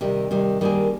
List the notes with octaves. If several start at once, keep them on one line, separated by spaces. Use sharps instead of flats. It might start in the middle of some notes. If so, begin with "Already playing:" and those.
C3 D#3 G3
C3 D#3 G3
D#3 G3 A#3 D4 G#4